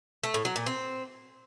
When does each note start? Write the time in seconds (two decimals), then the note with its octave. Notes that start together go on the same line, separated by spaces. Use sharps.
0.24 A3
0.34 A2
0.45 F#3
0.56 A#2
0.66 C4